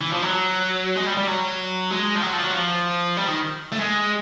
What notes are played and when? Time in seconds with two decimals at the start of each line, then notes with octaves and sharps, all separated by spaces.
0.01 E3
0.12 F3
0.22 F#3
0.96 G#3
1.06 G3
1.17 G3
1.28 F#3
1.91 G#3
2.15 F3
2.22 F#3
2.33 F3
2.43 F#3
2.53 F3
3.17 G3
3.27 D#3
3.72 A3
3.80 G#3